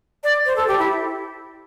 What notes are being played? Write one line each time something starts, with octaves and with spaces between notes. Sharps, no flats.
D5
C5
A4
G4
E4